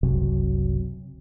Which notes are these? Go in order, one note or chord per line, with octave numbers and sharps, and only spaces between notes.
F#1 C2 C3 F#3